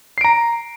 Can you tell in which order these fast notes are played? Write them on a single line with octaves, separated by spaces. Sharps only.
C7 D7 A#5